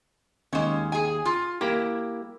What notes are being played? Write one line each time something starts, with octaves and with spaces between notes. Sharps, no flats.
D#2 G#3 C#4
G#4 G#5
F4
A#3 E4 G4